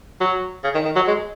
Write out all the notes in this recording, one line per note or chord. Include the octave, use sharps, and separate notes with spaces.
F#3
C#3
D#3
D#3
F#3
G#3